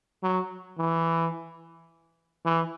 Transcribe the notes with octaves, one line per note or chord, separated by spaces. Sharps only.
F#3
E3
E3